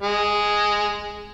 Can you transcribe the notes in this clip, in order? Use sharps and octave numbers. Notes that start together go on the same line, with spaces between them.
G#3